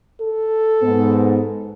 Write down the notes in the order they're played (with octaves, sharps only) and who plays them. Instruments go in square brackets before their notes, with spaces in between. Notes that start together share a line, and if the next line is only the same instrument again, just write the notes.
[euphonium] A4
[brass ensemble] G#2 B3